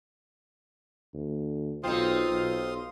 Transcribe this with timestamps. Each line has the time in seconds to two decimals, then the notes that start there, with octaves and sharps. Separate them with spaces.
1.14 D2
1.84 B1 C4 D#4 F4 F5 C6 D#6
2.31 B1